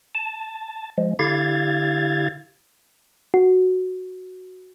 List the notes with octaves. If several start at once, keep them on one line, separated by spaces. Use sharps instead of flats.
A5
F3 G#3
D3 E4 G4 F5 G#6 A6
F#4